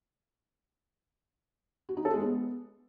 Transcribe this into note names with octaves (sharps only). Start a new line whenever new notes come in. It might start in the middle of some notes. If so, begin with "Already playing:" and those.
F#4
D#4
A4
G#3
B3